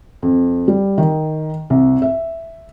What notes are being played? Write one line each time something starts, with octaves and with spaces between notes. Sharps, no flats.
F2
G3
D#3
C2
E5